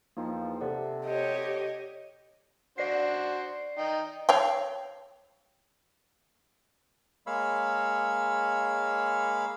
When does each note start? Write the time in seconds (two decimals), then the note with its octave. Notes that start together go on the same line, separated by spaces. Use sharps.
0.17 E2 F3 A#3 D#4 G5
0.61 C3 A4 D5 F#5
1.06 G4 C#5 D#5
2.78 D4 F#4 C5 D5 C7
3.78 D#4 G5
4.29 C#5 F5 G5
7.27 G#3 A#3 C#5 F5 B5 E6